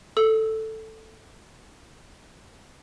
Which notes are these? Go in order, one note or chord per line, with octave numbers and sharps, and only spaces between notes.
A4 E6